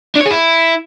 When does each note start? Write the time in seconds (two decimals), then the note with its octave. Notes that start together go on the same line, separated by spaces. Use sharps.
0.16 D4
0.21 C#5
0.26 G#4
0.31 E4